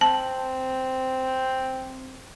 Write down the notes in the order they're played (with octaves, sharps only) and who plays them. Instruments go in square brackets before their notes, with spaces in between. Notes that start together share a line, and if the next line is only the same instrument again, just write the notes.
[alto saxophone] C4 [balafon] A5